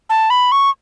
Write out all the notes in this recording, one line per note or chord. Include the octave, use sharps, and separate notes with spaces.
A5
B5
C#6